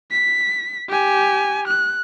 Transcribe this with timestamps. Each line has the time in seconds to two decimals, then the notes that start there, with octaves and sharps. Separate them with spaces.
0.11 B6
0.89 G4 G#5
1.68 F#6